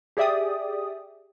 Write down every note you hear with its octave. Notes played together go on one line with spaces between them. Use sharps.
G4 G#4 D5 E5 G5 D#6